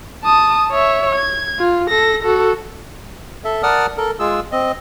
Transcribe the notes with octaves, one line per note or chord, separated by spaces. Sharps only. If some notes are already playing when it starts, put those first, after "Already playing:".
A5 D#6
C#5 E5
G#6
F4
A4 A#6
F#4 A4
A4 E5
A#4 D5 F#5 A5 D#6 F6
A4 A#4
G#3 F4 G#4 E6
C4 D#5